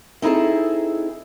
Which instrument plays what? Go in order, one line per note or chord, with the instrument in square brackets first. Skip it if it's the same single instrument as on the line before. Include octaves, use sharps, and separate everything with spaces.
[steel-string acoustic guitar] C4 D#4 E4 G#4 A4